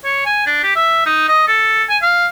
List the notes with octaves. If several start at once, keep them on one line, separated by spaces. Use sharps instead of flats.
C#5
G#5
D4
G4
E5
D#4
D#5
A4
G#5
F5